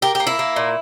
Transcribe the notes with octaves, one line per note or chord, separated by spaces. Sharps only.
A#3 G4
A#3 G4
E4
A#3
A#2